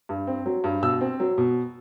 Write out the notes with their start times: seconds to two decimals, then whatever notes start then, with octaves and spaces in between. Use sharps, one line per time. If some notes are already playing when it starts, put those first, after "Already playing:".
0.09 G2
0.27 C4
0.46 F#3
0.64 G2
0.83 B2 E6
1.01 C4
1.20 F#3
1.38 B2